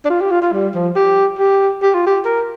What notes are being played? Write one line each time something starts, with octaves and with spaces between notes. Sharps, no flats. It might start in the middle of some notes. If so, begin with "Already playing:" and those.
D4
F4
G4
F4
F4
G3
F3
G4
G4
G4
F4
G4
A#4